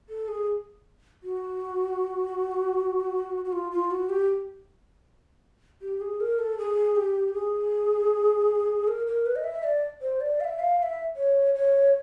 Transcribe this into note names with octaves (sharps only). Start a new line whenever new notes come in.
A4
G#4
F#4
F#4
F4
F4
F#4
G4
G4
G#4
A#4
A4
G#4
G4
G#4
A#4
A#4
B4
D#5
E5
D5
C5
D5
F5
E5
F5
F5
E5
C#5
C#5